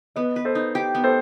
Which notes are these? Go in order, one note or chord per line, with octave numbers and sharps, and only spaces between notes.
B3 B4 D#5
B4
A4 C5
D#4
G4
B3
A4 C5